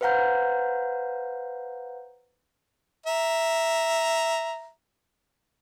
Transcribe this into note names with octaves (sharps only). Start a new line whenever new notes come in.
B4 C5 F5 F#5 A#5 G6
E5 A#5